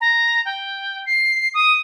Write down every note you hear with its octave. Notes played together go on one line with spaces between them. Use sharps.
A#5
G5
C7
D#6